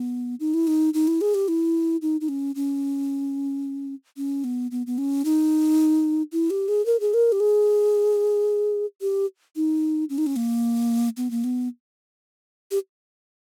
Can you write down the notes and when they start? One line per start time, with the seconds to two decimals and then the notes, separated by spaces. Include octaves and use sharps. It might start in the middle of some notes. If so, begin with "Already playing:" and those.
Already playing: B3
0.40 D#4
0.54 E4
0.67 D#4
0.94 D#4
1.08 E4
1.21 G#4
1.34 G4
1.48 E4
2.02 D#4
2.21 D#4
2.29 C#4
2.55 C#4
4.17 C#4
4.44 B3
4.71 B3
4.87 B3
4.98 C#4
5.25 D#4
6.33 E4
6.50 G4
6.68 G#4
6.86 A#4
7.00 G#4
7.14 A#4
7.32 G4
7.40 G#4
9.01 G4
9.56 D#4
10.10 C#4
10.18 D#4
10.26 C#4
10.36 A#3
11.17 B3
11.31 A#3
11.44 B3
12.71 G4